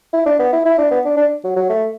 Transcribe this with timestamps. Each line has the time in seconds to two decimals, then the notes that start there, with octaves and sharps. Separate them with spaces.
0.13 E4
0.26 D4
0.39 B3
0.53 E4
0.65 E4
0.78 D4
0.91 B3
1.05 D4
1.17 D4
1.44 F#3
1.56 F#3
1.70 A3